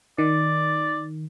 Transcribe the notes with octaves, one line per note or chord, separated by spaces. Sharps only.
D#3 D5